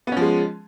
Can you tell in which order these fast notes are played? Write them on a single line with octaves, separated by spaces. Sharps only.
B3 C#4 F3 G#3